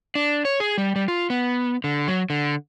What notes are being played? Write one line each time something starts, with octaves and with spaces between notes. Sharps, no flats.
D4
C#5
G#4
G3
G3
F4
B3
D3
F#3
D3